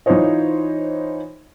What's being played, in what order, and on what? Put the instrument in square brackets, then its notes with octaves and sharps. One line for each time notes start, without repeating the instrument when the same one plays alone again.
[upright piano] E3 D#4 F4 C5 C#5 D#5